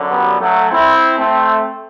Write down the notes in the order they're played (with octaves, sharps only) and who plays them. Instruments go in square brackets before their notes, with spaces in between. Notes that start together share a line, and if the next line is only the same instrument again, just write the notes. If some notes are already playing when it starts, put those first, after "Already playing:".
Already playing: [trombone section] F#2 D3 F#3
G3 B3
F#3 A3
C4 E4
A3 C4